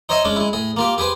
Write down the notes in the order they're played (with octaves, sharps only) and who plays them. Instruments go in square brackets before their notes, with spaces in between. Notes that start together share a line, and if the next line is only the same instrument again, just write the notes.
[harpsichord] D#4 C5 C#5 D#5 E5
G#3 C#4 D4
G#3 E4
A2 G#4
A#3 F4 G4
G4 G#4 B4 C5